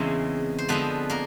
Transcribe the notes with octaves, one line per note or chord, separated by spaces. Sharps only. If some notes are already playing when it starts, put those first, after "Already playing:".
Already playing: E2 C#3 E3 G#3 C4
C5
D3 F3 G#3 B3 C4 B4
A#3 A#4